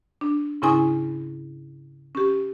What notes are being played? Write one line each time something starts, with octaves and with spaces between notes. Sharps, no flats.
D4
G#2 C#3 C#4 E4 G#5 D#6
C#4 G4